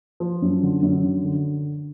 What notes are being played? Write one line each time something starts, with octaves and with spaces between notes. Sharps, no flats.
F3
F#2
D3
F#2
D3
D3